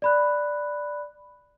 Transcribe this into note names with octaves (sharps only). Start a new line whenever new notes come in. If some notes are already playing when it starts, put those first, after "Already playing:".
D5 B5 F#6